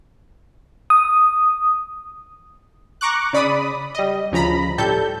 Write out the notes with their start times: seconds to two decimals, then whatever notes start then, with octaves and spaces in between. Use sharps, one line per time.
0.90 D#6
3.01 A#5 C#6 D6 F#6
3.33 C#3 D5 B5 D#6
3.95 G3 D#5
4.32 D2 C#3 F3 A#5 B5
4.78 A2 G3 A4 G6